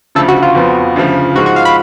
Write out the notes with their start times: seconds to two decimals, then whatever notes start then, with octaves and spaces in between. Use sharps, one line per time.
0.15 D2 C#3 F3 A4
0.28 F#4
0.42 F4
0.55 F2 F3 B3
0.96 D2 C#3 F3
1.35 G#2 F3 G#3 F#4
1.46 F#4
1.56 F5
1.65 B5